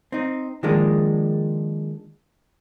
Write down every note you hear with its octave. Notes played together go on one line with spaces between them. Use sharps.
C4 D#4
D#3 F3 G#3 A#3 D4